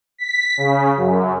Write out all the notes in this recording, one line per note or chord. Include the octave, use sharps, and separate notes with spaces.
B6
C#3
F#2